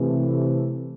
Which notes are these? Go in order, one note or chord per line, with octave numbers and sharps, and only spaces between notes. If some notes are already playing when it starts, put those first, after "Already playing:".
Already playing: C3 E3 A3